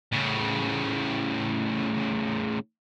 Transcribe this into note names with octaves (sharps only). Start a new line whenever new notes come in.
A2 C#3